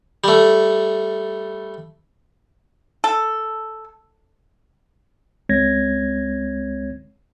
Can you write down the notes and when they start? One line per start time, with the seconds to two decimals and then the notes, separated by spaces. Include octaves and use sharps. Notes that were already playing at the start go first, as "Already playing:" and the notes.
0.24 G3 A3
3.04 A4
5.49 C#2 G#3 C4 C#5 G#6 A#6